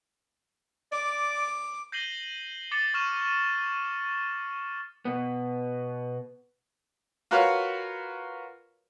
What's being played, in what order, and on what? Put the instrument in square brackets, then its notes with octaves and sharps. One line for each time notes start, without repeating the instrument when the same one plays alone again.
[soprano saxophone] D5 [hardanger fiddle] D6
[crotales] G6 A#6 C7 D#7 F#7 G7
D6 A6 C#7
C#6 F6 D#7 E7
[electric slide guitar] B2 B3
[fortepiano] F4 F#4 A#4 B4 C#5 F5